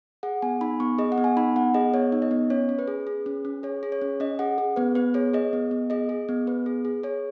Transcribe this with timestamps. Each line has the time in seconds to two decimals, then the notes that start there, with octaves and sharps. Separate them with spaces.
0.23 G#4 F#5
0.42 B3 G#5
0.61 D#4 B5
0.80 B3 C#6
0.98 G#4 D#5
1.12 F#5
1.18 B3
1.24 G#5
1.37 D#4 B5
1.56 B3 F#5
1.74 G#4 D#5
1.94 B3 C#5
2.12 D#4
2.22 D#5
2.31 B3
2.50 C#4 C#5
2.69 C#4
2.79 B4
2.87 G#4
3.07 G#4
3.26 C#4
3.45 C#4
3.63 G#4 C#5
3.83 G#4
3.92 C#5
4.02 C#4
4.20 C#4 D#5
4.39 G#4 F#5
4.58 G#4
4.76 B3 B4
4.95 B3 B4
5.14 G#4 C#5
5.34 G#4 D#5
5.53 B3
5.71 B3
5.90 G#4 D#5
6.09 G#4
6.29 B3
6.47 B3 B4
6.66 G#4
6.85 G#4
7.03 G#4 C#5